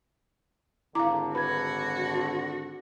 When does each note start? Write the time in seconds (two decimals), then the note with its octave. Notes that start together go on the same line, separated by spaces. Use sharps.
0.95 G#1 D3 E4 F5 A#5 D6
1.35 F#4 B4 B5 G#6